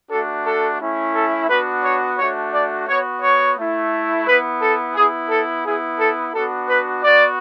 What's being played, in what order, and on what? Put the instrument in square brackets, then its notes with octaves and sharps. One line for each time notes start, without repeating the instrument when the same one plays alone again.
[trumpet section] A3 D4 F#4 A4
A4
A3 C#4 E4
A4
B3 D4 F#4 B4
C#5
A3 D4 F#4 C#5
D5
B3 F#4 C#5
C#5
A3 E4
B3 E4 B4
A4
B3 E4 G#4
A4
B3 E4 G#4
A4
B3 D4 F#4 A4
B4
B3 F#4 D5